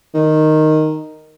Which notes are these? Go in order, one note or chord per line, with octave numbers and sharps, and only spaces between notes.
D#3